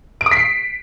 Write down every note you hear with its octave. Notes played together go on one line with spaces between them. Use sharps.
D7
D#6
B6
C7